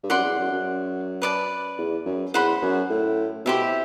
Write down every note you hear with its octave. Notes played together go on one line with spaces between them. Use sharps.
G2
F#2 D5 F#5 C6
E2
F#2
F#2
B4 D5 A5
E2
F#2
E2 C5 F#5 B5
F#2
A2
B2 E4 G4 C5 E5